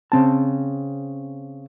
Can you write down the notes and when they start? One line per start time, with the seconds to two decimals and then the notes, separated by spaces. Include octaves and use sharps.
0.12 C#3 C4 A5